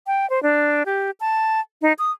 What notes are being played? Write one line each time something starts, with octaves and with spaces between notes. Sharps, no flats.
G5
C5
D4
G4
A5
D#4
D#6